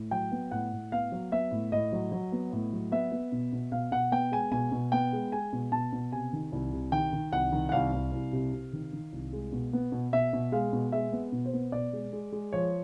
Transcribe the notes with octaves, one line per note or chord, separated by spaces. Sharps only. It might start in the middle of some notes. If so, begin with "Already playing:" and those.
Already playing: A2
F#3 G5
B3
A2 F#5
A2
B3 F5
F#3
B3 E5
A2
A2 D#5
F#3
F#3
B3
A2
F#3
B3 E5
B3
B2
B2
B2 F5
B2 F#5
B3 G5
G#3 G#5
B2 G#5
B2
B3 G5
G#3
G#3 G#5
B2
B2 A5
B2
C3 G#5
D#3
C2
C3
D#3 G5
D#3
C2 F#5
D#3
F#5
C2 F5
C2
C2
C3
C3
D#3
D#3
C2
G#3
B2
B3
B2
B2 E5
B2
G#3 F5
B2
G#3 E5
B3
B2
C5
B3
B2 D5
G#3
G#3
G#3
F3 C#5